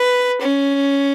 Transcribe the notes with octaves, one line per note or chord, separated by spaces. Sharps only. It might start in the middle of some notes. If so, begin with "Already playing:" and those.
Already playing: B4
C#4